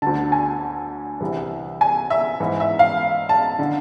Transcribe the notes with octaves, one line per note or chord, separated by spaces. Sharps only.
D2 D3 A5
G#5
C2 C3 E3
G#5
E5
G#2 E3
E5
F5
A5
D3